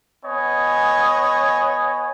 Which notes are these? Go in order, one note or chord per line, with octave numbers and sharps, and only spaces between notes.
B3 C#5 D#5 G#5